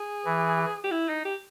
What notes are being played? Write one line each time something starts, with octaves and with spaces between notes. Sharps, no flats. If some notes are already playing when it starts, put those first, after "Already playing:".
Already playing: G#4
E3
G4
E4
D#4
G4